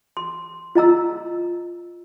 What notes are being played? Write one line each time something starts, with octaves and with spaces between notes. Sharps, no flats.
C6
F4 D#5 A#5 E6